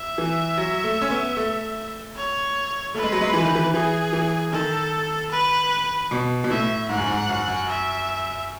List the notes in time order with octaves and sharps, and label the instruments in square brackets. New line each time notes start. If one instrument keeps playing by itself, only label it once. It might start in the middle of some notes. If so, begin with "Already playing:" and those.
Already playing: [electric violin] E5
[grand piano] E3
F#3
A3
C#4
B3
A3
[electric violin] C#5
[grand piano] A3 [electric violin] B4
[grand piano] G#3
F#3
G#3
E3
D#3
E3
[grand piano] E3 [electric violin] G#4
[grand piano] E3
[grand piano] D#3 [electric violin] A4
[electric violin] B4
[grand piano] B2
B2
[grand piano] A2 [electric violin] E5
[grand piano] G#2 [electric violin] F#5
[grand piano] F#2
G#2
F#2
F#2
[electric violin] E5